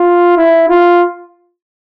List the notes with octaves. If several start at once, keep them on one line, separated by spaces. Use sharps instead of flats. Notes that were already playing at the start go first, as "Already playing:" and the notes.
Already playing: F4
E4
F4